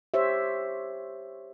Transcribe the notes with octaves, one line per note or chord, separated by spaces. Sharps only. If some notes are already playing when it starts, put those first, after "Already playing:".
G4 C5 C#5 E5